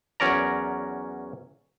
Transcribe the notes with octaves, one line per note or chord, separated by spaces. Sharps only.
E2 F#3 C#4 A#4 D5 A#5